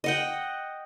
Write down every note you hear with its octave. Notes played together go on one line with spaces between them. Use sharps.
D#5 F#5 G5